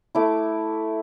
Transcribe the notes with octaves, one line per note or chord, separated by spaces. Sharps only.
A3 E4 D6